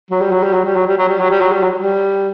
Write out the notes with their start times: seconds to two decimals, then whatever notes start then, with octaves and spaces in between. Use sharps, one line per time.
0.10 F#3
0.21 G3
0.32 F#3
0.43 G3
0.53 F#3
0.65 G3
0.76 F#3
0.87 G3
0.97 F#3
1.08 G3
1.19 F#3
1.30 G3
1.41 F#3
1.52 G3
1.63 F#3
1.79 G3